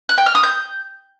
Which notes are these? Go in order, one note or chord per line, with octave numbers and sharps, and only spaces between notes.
F#6
G5
F6
D#6
G6